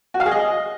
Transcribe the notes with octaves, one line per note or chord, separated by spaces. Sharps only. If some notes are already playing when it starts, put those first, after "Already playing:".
F#4
F5
G#4
D#5